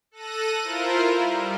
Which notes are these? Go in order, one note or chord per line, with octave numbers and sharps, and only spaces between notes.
A4 F#6 A#6 D#7
E4 F4 A#4 C5
G3